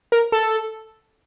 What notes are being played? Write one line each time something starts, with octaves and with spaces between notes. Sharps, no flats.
A#4
A4